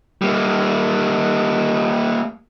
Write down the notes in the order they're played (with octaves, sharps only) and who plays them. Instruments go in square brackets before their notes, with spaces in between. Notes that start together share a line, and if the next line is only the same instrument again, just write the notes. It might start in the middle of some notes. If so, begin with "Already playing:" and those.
[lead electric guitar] G3 A#3